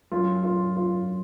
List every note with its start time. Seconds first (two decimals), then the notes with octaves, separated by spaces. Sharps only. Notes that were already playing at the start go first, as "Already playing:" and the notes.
0.12 F#2 F4
0.44 F4
0.77 F4